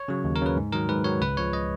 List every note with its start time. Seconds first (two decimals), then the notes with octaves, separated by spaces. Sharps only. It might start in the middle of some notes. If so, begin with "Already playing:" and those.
Already playing: C#5
0.08 C#3 F#3
0.24 D#2
0.36 A#4
0.41 C#3 F#3 B4
0.57 G#2
0.72 D#3 F#3 A#4
0.89 G#2 B4
1.04 D#3 F#3 C#5
1.21 C#2 B4
1.37 C#3 F3 G#3 C#5
1.53 D#5